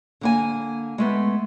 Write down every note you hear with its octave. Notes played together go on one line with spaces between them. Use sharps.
D3 A#3 G#5
G#3 A3 B3